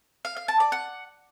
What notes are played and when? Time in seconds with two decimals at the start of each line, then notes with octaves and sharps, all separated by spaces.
0.25 F5
0.36 F5
0.48 A5
0.60 D5
0.72 F#5